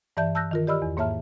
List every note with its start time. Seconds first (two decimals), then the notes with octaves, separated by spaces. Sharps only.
0.17 G2 E3 D5 E5 A5 G6
0.35 A5 E6 F#6 G6 A#6
0.51 D#3 F4 A#4
0.67 G4 D5 D#5 B5 E6 F6
0.82 E2
0.97 G#2 A#3 C#5 E5 A5 F6